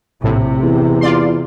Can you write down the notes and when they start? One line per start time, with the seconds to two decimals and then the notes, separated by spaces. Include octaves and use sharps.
0.23 A#1 A2 C3
0.63 E2
1.01 F4 D5 C6